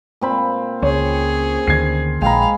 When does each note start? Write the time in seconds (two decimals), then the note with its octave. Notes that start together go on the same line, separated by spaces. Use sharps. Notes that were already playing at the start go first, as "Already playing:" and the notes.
0.21 A#2 C4 B5
0.82 C#2 C#4 G#4 C#5
1.67 D2 D3 D#3 G#6 C7
2.22 A#1 G#3 F5 G5 A#5 B5